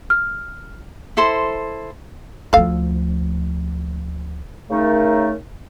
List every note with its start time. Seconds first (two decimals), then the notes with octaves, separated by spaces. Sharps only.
0.10 F6
1.17 E4 A4 C5 C6
2.53 D2 F3 A4 F5
4.70 C#3 A3 D#4 A#4